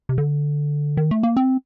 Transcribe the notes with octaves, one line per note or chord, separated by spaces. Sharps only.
C3
D3
D#3
A3
A#3
C4